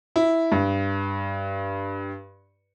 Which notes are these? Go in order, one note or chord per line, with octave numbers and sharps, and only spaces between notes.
E4
G2